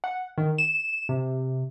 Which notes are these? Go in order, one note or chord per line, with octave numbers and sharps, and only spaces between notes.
F#5
D#3
E7
C3